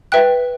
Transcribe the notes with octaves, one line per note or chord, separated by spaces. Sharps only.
B4 E5 G5 F#6